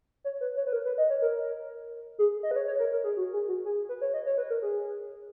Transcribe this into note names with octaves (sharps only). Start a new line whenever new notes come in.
C#5
B4
C#5
B4
A#4
B4
D#5
C#5
A#4
G#4
D#5
B4
C#5
C#5
A#4
A#4
G#4
F#4
G#4
F#4
G#4
B4
C#5
D#5
C#5
B4
A#4
G#4